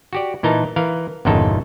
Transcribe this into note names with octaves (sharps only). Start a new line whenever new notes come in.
F#4 G4 D5
A#2 E3 D#4 A#4 A5
E3 A#4 F5
G1 E2 A#2 C#3 D#4 A4